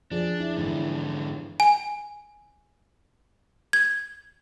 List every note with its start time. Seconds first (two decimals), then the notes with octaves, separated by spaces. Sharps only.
0.12 F3 D4 G#4
0.40 E4
0.57 G#2 D3 E3 D4 E4
1.60 G#5
3.73 G#6